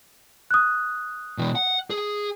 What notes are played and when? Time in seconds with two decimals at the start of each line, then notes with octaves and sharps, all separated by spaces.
0.51 D#6 F#6
1.38 B2 E3
1.55 F#5
1.90 G#4